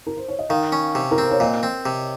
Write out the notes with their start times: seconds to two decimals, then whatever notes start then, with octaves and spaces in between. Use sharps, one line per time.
0.07 A#4
0.17 C5
0.28 C#5
0.39 D#5
0.49 D#3 F5
0.72 C#4
0.95 C3
1.11 A#4
1.18 C4 C5
1.31 C#5
1.40 A#2 D#5
1.63 C4
1.86 C3